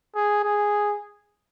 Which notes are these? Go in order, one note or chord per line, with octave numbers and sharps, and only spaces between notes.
G#4
G#4